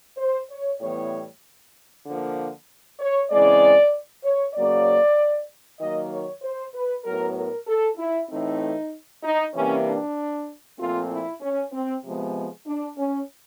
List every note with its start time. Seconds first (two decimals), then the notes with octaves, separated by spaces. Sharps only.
0.18 C5
0.50 C#5
0.80 A2 E3 G3 B3 C#5
2.06 D3 F3 A#3
2.99 C#5
3.29 C#3 E3 G#3 C4 D5
4.24 C#5
4.54 C#3 F#3 A#3 D5
5.79 D#3 F#3 A#3 D#5
6.11 C#5
6.42 C5
6.74 B4
7.04 A2 F#3 B3 A#4
7.35 A#4
7.67 A4
7.97 E4
8.29 A2 E3 A3 C4 D#4
9.23 D#4
9.54 C3 E3 G3 A#3 C#4
9.85 D4
10.78 A#2 F3 A3 C4 F4
11.10 E4
11.40 C#4
11.72 C4
12.04 C3 F3 G#3 B3
12.65 D4
12.97 C#4